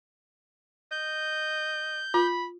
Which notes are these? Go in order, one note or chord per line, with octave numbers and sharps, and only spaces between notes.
D#5 G6
F4 B5